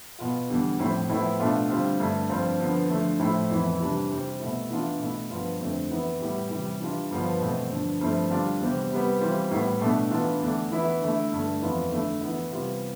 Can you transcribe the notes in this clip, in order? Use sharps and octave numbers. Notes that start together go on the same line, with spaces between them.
B2 B3 F4
E2 D3 G3
A2 F3 C4
A2 F3 B3 E4
B2 A3 D4 F4
D3 G3 C4 F4
G2 D3 A3
G2 F3 C4 F4
D3 F3 B3
D3 F3 A3
A2 F3 A3 E4
F2 E3 B3
C3 E3 G3 D4
C3 G3 C4
B2 A3 E4
E3 B3 D4 F4
B2 A3 E4
G2 F3 B3 F4
F2 D3 A3 C4
E3 B3 E4
A2 G3 B3 E4
C3 E3 G3
E3 G3 D4 F4
G2 D3 F3 B3 F4
E2 B2 A3 C4
G2 D3 F3
G2 F3 A3 C4 E4
D3 G3 D4 F4
E2 C3 G3 C4
C3 G3 B3
E3 G3 C4 F4
A2 G3 B3
B2 A3 D4
E3 B3 D4 F4
E2 D3 A3 D4
E3 B3 E4
D3 A3 E4
G2 D3 A3
F2 E3 B3 F4
D3 A3 E4
E3 B3 E4
C3 G3 B3 F4